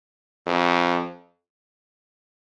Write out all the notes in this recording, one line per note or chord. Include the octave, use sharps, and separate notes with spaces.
F2